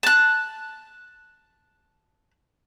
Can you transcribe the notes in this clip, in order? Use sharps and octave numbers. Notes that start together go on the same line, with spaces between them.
A5 F#6